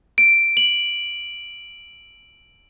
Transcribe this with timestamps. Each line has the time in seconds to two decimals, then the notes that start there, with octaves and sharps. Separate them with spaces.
0.18 D7
0.57 F#7